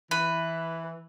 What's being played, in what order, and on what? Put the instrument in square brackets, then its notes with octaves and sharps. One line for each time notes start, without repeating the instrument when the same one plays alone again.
[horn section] E3 [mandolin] B4